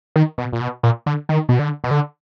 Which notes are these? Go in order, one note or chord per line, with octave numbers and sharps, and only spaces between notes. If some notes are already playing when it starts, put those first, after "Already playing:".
D#3
B2
A#2
B2
A#2
D3
D#3
B2
D3
B2
D3